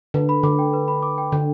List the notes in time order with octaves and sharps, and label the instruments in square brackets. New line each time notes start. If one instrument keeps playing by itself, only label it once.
[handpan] D3 [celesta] B4
[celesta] B5
[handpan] D3 [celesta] D6
[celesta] G5
B4
B5
D6
G5
[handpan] D3 [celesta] D4